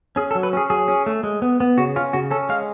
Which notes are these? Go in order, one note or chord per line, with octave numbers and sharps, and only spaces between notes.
C#4 G#4
A4
F#3
B4
C#4 G#4
F#3 G#4
C#4
A3
G#3
B3
B3
C#3 F#4
C#4 F4
C#3 F#4
C#4 A4
G#3 F5